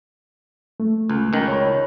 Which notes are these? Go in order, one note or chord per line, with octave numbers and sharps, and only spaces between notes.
A3
C#2
C#2 D#3
C#5 B5